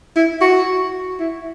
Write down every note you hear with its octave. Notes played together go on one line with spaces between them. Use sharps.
E4
F#4
E4